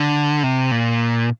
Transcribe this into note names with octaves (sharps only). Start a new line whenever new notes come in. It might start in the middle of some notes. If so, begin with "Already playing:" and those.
Already playing: D3
C3
A#2